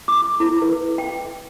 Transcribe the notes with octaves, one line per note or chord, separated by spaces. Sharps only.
D6
E4
B4
G5